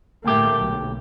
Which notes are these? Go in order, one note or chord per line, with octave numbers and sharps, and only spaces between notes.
D2 A2 A3 A#3 G4
B1